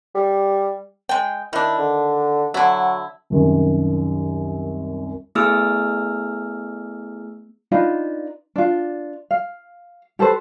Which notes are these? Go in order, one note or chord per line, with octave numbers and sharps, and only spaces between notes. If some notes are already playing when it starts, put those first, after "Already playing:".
G3
G#3 G5
D#3 D4 E4
D3
D3 F#3 E4
C2 F#2 D#3
A3 B3 E4 G#4 E6 F6
D4 D#4 F4 B4
D4 F4
F5
G4 A4 B4 C5